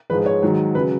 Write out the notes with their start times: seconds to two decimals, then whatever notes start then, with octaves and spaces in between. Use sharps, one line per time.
0.10 G#2 F3 G#3 B4
0.26 C#5
0.43 G#2 D#3 F#3
0.75 C#3 F#3 B4